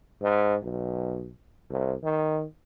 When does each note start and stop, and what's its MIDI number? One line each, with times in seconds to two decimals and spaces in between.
0.22 0.55 44
0.62 1.32 35
1.70 1.94 36
2.03 2.44 51